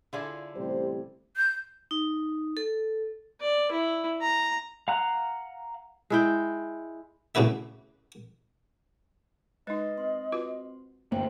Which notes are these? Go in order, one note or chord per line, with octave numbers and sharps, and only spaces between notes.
D3 E4 F4 G#4 A4 D5
A1 C3 G3 C5
G6
D#4
A4
D5
E4
A#5
F5 F#5 A#5 F#6
G#3 E4 G5
A2 C#3 F#4 B4 E5
G#3 D#4 B4 D#5 A6
C4 C6
F4 F#4 B4
D2 G2 A#3 C5 E5 G5